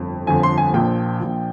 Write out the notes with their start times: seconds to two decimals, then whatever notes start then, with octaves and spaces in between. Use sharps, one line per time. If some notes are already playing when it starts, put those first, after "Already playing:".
Already playing: G1 F2
0.27 G1 F2 D3 F3 G#5
0.43 C6
0.58 G#5
0.74 A#1 A#2 F3 G5
1.20 A#1 A#2 F3